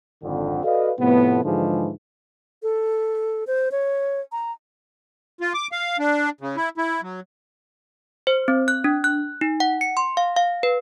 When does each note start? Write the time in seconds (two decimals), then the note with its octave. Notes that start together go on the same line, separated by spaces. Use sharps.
0.23 G#1 F2 D3
0.64 F#4 A4 B4 D5 D#5 F5
0.99 A2 C3 F3 A3 B3
1.44 G#2 D3 E3 F3 G#3
2.63 A4
3.47 C5
3.72 C#5
4.32 A#5
5.41 F4
5.54 D6
5.72 F5
5.99 D4
6.41 C#3
6.56 E4
6.78 E4
7.02 F#3
8.27 C5
8.48 C4
8.68 F#6
8.84 D4
9.04 F#6
9.41 D#4
9.60 F#5
9.81 C#7
9.97 C6
10.17 F5
10.37 F5
10.63 B4